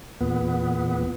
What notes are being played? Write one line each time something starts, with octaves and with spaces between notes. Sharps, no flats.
E2 A#2 B3